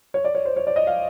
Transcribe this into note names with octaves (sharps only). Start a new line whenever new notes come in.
C#5
D5
C#5
C5
C#5
D5
D#5
F5